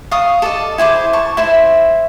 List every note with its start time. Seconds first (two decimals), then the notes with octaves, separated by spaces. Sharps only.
0.11 F5 C#6 D#6
0.42 A4 D5 D#5
0.78 E4 G#4 C5 D6
1.13 A5 C#6
1.37 E4 C5 E5